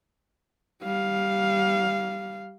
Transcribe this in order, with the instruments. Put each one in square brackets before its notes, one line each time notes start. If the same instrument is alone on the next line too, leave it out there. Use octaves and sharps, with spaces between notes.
[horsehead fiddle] G3 F5